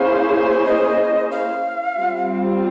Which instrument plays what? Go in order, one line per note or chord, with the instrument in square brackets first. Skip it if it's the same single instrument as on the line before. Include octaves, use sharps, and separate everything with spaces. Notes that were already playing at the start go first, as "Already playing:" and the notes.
Already playing: [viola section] A#3 C#4 E4 G#4 C5 [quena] F5
[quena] D#5
F5
[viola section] G3 C4 F4